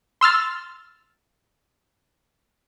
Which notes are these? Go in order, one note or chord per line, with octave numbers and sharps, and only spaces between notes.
C6 E6 F6 A6